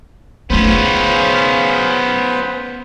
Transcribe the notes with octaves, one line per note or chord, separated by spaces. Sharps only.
C#3 A3 B3 C#4 F4 B4 C5